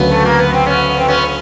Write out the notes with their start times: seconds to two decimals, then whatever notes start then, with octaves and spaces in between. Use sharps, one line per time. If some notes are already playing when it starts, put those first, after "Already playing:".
Already playing: D2 C#3 F#3 B3
0.12 A3
0.25 A#3
0.39 B3
0.53 C4
0.66 B3 C#4
0.98 C4
1.08 B3 C#4